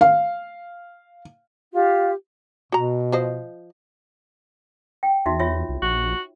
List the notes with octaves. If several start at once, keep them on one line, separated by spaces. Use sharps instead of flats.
F5
F4 G4
B2 F#4 A#5
F3 C5 D#5
G5
E2 D#4 F#4 E5
F4 C#5 E5
C2
A#1 F#4